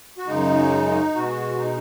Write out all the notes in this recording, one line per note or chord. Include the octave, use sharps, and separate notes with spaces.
F#4
F#2 C#3 G#3 D#4
B2 G#3 F#4
D#4